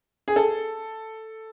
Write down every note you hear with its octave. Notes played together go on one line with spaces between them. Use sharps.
G#4
A4